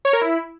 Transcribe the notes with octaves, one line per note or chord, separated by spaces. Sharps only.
C#5
A#4
E4